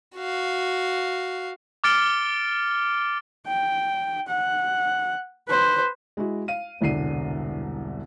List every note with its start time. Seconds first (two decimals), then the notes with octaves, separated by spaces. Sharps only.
0.17 F#4 F5
1.84 D6 F6 A6 C#7 D7 G7
3.47 G5
4.28 F#5
5.49 B4 C5
6.17 G#3 E4 F#4
6.48 F5 D#7
6.81 E1 C2 D3 C7 D#7